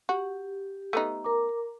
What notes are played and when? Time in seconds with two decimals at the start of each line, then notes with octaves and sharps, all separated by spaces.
0.09 F#4 G4
0.93 A3 B3 D#4
1.24 A#4 A#5 D6